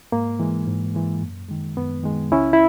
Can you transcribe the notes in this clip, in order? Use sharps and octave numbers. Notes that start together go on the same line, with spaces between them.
G#2 A#3
E3 G#3
G#2
E3 G#3
F#2
D#3 G#3
F#2 B3
D#3 G#3
C#2 C#4 E4
E4